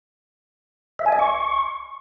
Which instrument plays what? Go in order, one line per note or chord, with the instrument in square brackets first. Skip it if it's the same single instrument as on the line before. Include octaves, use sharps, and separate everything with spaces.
[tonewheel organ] E5
G#5
D#5
C#6